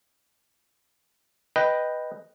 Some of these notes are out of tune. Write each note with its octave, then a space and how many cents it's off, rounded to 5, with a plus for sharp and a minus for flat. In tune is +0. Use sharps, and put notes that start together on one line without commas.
B4 +0 D#5 +0 G5 +0